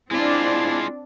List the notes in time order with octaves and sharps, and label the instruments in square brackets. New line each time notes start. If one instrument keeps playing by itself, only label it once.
[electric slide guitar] G#3 F4 [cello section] C4 D4 [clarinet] E4